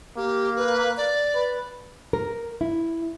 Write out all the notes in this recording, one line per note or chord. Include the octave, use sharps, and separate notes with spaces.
A#3 G4
B4
D5
B4
A#4
E4